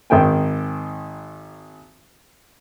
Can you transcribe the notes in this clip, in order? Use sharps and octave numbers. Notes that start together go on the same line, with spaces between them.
G#1 D#3 G5 G#5